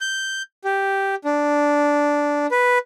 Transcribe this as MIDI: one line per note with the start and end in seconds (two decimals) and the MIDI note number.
0.01 0.42 91
0.64 1.15 67
1.25 2.47 62
2.51 2.78 71